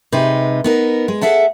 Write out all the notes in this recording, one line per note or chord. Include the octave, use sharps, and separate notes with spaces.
C3 G#3 D#4 B4
B3 D#4 A#4
G#3
G#4 A4 E5 F#5 A5